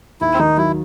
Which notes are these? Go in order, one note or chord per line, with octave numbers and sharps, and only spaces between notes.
D#2 E4
C4
D#3 D#4
F#3 E4